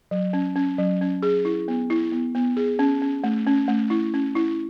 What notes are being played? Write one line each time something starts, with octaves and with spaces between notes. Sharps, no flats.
F#3
C#4
C#4
F#3
C#4
G#4
E4
B3
E4
B3
B3
G#4
C#4
C#4
A3
C#4
A3
E4
C#4
E4